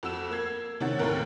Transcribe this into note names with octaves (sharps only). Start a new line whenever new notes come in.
F2 F#4 E6 E7
A#3 E6 G#6 C7
C3 D#3 C#4 F#5 A6
D#2 A2 C3 A#4 F#6